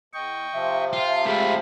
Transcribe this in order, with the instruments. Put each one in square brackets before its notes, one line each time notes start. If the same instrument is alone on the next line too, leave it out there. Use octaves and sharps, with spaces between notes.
[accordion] E2 [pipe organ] D#5 G5 C#6
[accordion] C3 F3 [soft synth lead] E5
[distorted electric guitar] F4 [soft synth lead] E5
[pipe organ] G#3 F5 B5 [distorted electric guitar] A3 G4